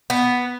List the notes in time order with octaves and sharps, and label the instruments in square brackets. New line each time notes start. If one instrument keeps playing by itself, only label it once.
[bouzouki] B3